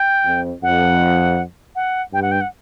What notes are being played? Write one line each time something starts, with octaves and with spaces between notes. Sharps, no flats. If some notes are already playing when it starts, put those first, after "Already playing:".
Already playing: G5
F2
F2 F#5
F#5
G2 G5
F#5
G5
F#5